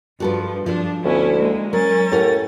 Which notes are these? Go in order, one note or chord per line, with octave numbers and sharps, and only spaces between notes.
G2 F3 F#4 A4 B4
G2 F3 D4 F4 A4
D2 B3 C#4 E4
G#3 A#3
F#3 C#4 A#4 A6
A2 G4 A#4 F#5